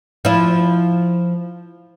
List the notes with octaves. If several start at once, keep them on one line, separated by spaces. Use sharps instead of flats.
F3 E4